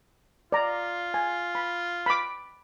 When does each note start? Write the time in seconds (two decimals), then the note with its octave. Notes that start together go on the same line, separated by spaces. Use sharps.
0.52 F4 D5 A#5
1.14 G#5
1.55 B5
2.06 B5 D6